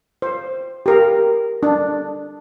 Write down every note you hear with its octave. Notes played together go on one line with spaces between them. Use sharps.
C5
G4 A#4
D4